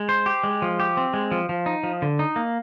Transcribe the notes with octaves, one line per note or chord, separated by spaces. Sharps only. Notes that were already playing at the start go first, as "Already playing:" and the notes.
Already playing: G#3
C5
G4
G#3
F3
G4
C4
G#3
F3
F3
D#4
F3
D3
D#4
A#3